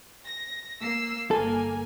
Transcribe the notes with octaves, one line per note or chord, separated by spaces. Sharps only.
A#6
A#3 E6 C7
G1 A#3 A4 G#5